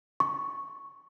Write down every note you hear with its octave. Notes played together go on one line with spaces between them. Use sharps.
C#6